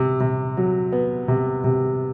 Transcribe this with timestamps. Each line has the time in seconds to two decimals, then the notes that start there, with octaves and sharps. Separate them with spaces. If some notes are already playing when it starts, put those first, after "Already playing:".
Already playing: C3
0.20 C3
0.57 F#3
0.92 B3
1.28 C3
1.64 C3